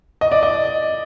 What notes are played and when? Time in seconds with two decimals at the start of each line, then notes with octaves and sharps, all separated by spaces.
0.21 D#5
0.32 D5
0.43 D#5